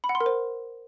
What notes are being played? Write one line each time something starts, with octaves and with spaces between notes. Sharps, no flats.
B5
F#5
C6
A#4
C5